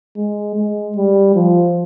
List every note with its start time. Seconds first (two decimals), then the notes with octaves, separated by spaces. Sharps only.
0.17 G#3
0.56 G#3
0.96 G3
1.35 F3